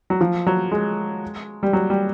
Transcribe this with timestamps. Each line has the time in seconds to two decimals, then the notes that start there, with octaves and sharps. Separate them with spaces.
0.10 F#3
0.21 F3
0.47 F#3
0.71 G#3
1.63 G3
1.73 F#3
1.90 G3